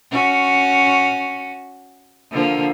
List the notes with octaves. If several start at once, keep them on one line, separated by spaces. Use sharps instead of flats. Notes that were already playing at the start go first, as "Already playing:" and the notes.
C#4 F#4
D3 F3 A#3